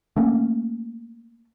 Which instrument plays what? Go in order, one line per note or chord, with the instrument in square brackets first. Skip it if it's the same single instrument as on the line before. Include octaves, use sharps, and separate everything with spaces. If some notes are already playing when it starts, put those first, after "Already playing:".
[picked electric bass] A3 A#3 C#4